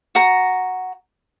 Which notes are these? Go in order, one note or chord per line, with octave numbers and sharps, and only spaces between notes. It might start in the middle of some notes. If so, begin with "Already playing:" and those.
F#4 A#5